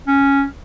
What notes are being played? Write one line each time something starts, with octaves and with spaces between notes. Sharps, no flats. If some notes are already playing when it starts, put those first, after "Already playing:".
C#4